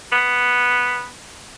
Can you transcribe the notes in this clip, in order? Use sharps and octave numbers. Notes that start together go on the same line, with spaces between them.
B3